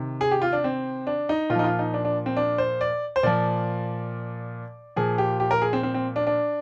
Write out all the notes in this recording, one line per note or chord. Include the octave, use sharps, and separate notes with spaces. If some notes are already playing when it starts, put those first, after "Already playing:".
Already playing: C3 D#3
G#4
G4
F4
D4
C4
D4
D#4
A#2 F4
F3 D#4
F4
D#4
D4
D4
C4
D4
C5
D5
C5
A#2 F3 D5
A#2 F3 G#4
G4
G4
A#4
G#4
C4
C4
C4
D4
D4